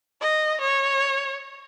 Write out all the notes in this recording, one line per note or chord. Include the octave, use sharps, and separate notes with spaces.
D#5
C#5